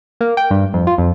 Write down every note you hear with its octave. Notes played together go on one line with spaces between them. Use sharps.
A#3
G5
G2
F2
F4
F2